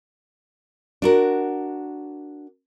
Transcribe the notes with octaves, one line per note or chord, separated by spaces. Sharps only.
D4 F#4 A#4